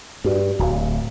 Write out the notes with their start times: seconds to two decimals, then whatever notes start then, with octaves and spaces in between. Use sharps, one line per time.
0.24 G2 F#4 G4
0.59 D1 F#4 F5